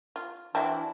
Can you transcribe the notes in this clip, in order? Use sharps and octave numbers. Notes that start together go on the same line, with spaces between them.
F4
E3 F#3 C4 D4 E4 E5 A5